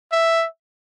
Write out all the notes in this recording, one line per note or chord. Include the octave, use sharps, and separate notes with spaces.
E5